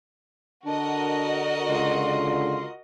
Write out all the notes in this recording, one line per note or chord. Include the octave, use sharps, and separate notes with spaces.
D3 D4 F#4 A#4 D#5
C#2 F4